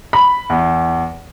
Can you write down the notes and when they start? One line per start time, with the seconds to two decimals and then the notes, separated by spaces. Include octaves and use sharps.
0.13 B5
0.50 E2